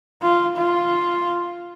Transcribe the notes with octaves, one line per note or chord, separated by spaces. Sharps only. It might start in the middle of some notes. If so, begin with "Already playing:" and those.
F4
F4